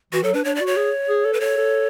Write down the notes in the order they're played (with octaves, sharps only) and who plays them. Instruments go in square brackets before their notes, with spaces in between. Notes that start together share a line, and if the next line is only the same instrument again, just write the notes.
[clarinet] E3 [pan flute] F#4
[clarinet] F#3 [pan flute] A4
[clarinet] D4 [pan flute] B4
[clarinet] D4 [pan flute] C#5
[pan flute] D5
[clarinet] F#4
[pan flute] C#5
[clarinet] G#4
G#4
A4
[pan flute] B4
[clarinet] A4 [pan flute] C#5
[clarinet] A4